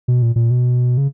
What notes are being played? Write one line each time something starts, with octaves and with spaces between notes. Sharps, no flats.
B2
A#2
A#2
B2
C#3